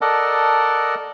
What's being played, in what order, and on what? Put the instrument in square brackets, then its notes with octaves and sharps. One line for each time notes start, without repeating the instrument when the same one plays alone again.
[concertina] A4 A#4 D5 D#5 F#5 A5